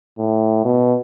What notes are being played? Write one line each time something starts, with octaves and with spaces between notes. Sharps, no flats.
A2
B2